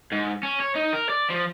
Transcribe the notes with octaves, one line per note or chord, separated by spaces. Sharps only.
G#2
C#4
C#5
D#4
A#4
D5
F3